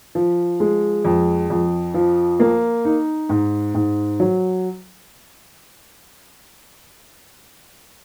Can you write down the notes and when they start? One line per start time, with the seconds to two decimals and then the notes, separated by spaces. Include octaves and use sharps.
0.15 F3
0.60 G#3
1.05 F2
1.50 F2
1.94 F3
2.40 A#3
2.85 D#4
3.29 G#2
3.74 G#2
4.20 F#3